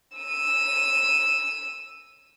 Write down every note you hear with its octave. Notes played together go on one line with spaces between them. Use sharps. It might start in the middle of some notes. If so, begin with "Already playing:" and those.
E6 D#7